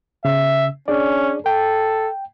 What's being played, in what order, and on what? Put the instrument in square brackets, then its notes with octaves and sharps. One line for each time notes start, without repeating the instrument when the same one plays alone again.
[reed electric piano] C#3 [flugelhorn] E5
[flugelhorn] C#4 [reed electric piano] D4 G#4 D5
[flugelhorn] A4 [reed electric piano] G5